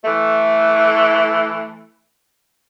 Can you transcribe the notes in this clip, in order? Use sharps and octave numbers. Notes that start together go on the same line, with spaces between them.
E3 A3